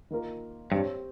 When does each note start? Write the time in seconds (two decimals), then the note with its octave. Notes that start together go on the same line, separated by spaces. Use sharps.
0.10 D#3 A#3 F4 A#4
0.72 G2 C4 G4 C#5